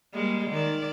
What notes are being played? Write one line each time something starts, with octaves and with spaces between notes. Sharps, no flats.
G3 G#3 A#3
D#3 D5